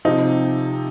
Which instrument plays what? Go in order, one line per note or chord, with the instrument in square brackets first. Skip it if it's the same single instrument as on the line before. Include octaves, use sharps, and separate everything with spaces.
[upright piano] C3 F3 D#4